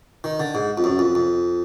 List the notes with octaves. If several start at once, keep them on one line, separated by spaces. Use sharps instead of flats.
D#3
D3
G#2
F2
F#2
F2
F2